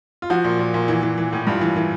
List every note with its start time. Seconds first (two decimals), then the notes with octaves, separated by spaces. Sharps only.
0.22 F4
0.30 F3 F#4
0.44 A#2
0.59 A#2
0.74 A#2
0.88 E3
1.03 E3
1.18 E3
1.33 A2
1.47 G2 F4
1.61 E3
1.76 E3